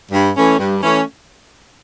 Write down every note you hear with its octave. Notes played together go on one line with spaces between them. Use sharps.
G2
E3 A3 C#4
G2
E3 A3 C#4